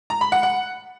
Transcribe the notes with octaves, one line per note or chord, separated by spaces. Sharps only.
A#5
B5
F#5
F#5